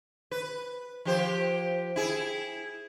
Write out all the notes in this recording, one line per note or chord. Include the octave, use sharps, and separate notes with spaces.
B4
F3 G4 C5
E4 G#4